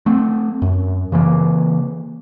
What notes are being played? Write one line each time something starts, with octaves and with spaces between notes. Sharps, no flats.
A3 C4
F#2
C#3 E3 A#3